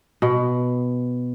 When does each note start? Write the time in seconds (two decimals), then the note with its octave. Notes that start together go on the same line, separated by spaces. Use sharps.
0.22 B2